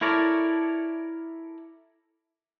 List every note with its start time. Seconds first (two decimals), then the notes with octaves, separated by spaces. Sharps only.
0.01 E4 A4 A#4 C#5 D5